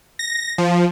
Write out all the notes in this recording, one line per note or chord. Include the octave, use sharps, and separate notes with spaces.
A#6
F3